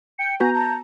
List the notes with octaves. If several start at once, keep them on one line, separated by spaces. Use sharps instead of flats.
G5 C#7
B3 F#4 B4 G#5 A#5 G6
A5